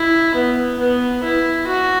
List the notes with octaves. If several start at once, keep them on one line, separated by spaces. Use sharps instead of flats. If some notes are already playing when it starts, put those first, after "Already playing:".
Already playing: E4
B3
B3
E4
F#4